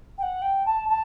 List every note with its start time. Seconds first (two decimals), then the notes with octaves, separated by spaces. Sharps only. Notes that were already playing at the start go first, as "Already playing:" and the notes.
0.18 G5
0.22 F#5
0.42 G5
0.66 A5
0.88 A5